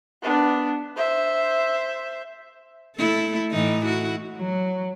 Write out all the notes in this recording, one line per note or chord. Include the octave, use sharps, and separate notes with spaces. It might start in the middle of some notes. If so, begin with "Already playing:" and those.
B3 D4
C5 E5
A3 E4 A4
A2 E3 D#4
E4 F#4
F#3